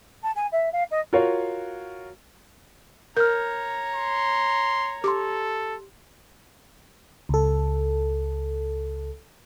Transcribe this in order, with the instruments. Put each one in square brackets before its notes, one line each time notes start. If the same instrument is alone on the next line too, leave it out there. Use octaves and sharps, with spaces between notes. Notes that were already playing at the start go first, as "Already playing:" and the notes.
[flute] A5
G#5
E5
F5
D#5
[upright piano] F4 F#4 A#4 C#5 F5
[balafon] A#4 [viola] C#5 A#5 [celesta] F6 G6
[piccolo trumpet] C6
[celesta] G4 C6 [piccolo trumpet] A4 [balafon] D6
[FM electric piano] C#2 A4